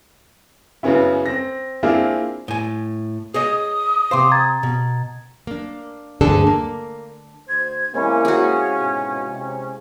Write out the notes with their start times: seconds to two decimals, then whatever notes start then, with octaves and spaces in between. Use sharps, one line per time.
0.83 F#2 C#3 B3 C#4 E4
1.26 C4 A#6
1.83 A#3 C4 D4 E4 F4 G#4
2.48 A2 G#5
3.34 G#4 C#5 D#5 D#6
4.11 C3 C5 F5 C6 D6
4.32 A#5 G#6 A6
4.63 B2
5.47 A#3 D4
6.21 D2 G2 D3 D4 G#4 A4
6.47 A#3
7.48 D2 C5 G#6
7.94 C3 G#3 A#3 C#4 E4
8.25 F#4 G#4 F5
8.78 G#2 B2
9.29 C3